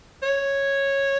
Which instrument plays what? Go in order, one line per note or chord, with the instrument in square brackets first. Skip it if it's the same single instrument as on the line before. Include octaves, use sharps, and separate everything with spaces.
[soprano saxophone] C#5